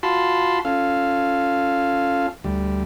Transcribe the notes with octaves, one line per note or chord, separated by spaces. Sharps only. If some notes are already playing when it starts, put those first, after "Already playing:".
F4 F#4 A5 B5 C6
C#4 F4 A4 F5
D2 G3